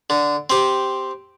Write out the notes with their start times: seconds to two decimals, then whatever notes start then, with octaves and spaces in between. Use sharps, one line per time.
0.10 D3
0.50 C4 G4